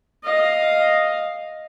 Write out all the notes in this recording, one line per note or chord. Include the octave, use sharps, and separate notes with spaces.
D#5 F5